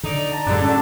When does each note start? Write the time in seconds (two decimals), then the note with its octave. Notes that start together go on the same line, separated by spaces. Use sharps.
0.03 D3 D#4 D5
0.31 A5 A#5
0.46 F#2 A2 D3 G3 G#3 D4
0.62 A3 C#4 F#4 A4